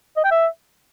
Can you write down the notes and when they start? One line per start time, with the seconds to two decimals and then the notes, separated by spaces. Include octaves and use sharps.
0.17 D#5
0.24 G5
0.31 E5